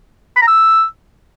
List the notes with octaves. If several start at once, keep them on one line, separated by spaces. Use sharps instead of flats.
B5
A#5
E6